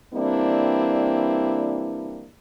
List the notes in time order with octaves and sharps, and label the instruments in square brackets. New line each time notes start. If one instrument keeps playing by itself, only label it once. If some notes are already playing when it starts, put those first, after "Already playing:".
[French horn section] E3 G3 A#3 C4 D4 E4